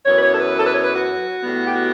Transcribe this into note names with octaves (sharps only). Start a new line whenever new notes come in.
F#2 E3 B3 C#5
B4
C#5
A4
B4
A4
B4
C#5
B4
F#4
A2 G3 B3
G4
F#4